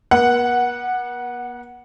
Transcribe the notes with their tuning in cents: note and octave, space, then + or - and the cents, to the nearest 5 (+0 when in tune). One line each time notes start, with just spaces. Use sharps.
B3 -45 F#5 +0